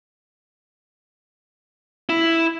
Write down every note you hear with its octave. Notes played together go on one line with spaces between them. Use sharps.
E4